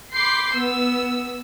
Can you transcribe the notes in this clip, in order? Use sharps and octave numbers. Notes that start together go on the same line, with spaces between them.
B5 C6 D6 G6 C7
B3 E6